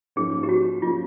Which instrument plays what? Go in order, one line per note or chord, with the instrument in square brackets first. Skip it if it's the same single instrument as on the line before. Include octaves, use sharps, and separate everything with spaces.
[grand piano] G#2 F3 A#3 C#4 [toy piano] G#4
[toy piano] G4
F#4
[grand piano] F3 A#3 C#4 [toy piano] F4